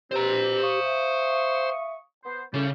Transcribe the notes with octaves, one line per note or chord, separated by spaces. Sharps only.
B2 C4 G4 C5 A#5
F5 C#6 D#6
E5
B3 C5
A2 C#3 G3 C#4